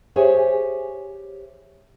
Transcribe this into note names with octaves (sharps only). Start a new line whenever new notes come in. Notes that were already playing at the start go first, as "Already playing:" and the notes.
G4 G#4 C5 C#5 E5 G#5